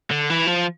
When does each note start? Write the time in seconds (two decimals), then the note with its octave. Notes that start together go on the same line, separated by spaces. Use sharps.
0.11 D3
0.30 E3
0.47 F3